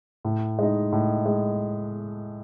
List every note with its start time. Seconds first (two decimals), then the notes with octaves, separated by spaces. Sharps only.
0.25 A2
0.59 G#3 D#4
0.92 A2
1.26 G#3